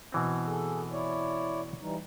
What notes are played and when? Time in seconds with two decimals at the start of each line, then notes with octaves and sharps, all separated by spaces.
0.12 B2 E3 C4
0.47 G#4 A4
0.92 E4 C#5 D5
1.81 E3 G3 D#4